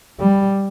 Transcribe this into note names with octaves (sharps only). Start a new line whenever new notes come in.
G3